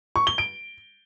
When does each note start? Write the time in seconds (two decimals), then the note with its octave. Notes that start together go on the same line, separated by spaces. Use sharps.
0.16 C#6
0.27 G7
0.38 D7